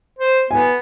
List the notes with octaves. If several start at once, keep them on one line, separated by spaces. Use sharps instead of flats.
C5
B3 G#5